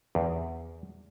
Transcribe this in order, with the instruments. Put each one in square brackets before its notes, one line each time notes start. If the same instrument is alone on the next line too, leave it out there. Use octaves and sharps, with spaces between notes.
[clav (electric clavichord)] E2